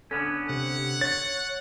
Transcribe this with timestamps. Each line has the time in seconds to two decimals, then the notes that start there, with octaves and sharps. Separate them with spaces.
0.11 D3 B3 C#4 A4
0.49 C3 F#5
1.01 C#5 A6